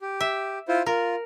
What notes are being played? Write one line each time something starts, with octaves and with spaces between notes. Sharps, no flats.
G4
E5
E4 F4 C5
F4 A#4